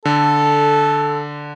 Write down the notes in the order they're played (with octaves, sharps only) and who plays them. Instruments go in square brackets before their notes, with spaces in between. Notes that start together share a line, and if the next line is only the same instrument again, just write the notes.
[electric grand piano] D3 [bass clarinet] A4